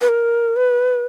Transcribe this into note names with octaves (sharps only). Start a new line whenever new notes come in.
B4
A#4
B4